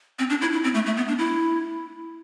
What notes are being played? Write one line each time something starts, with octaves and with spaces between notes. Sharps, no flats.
C4
D4
E4
E4
C4
A3
A3
B3
D4
E4